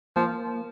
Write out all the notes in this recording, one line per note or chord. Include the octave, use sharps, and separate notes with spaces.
F3 A#3